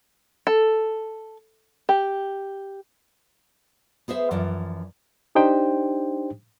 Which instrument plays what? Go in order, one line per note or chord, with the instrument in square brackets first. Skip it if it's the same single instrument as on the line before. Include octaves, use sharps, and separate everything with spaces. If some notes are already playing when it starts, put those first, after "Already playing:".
[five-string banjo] A4
G4
[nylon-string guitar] B3 G#4 C5 E5
F#2 E3 F3 D5
[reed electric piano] D4 D#4 G4 C5 G5